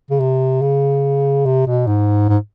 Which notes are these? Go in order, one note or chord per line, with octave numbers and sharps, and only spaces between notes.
C#3
C3
C#3
C3
B2
G#2
G#2